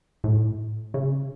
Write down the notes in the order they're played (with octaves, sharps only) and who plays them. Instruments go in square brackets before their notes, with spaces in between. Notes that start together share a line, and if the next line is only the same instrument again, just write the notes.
[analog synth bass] A2
C#3